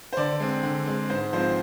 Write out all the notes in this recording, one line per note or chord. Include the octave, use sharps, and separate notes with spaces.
C5
D3 D5
G#3 C4
D3
G#3 C4
G#2 C5
F3 G#3 C4 C5